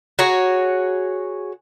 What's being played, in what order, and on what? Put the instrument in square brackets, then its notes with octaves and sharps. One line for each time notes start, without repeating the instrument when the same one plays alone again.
[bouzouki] F#4 G#4 C#5 A#5